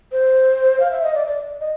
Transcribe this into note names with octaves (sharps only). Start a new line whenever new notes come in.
C5
F5
E5
D#5
D5
D5
D#5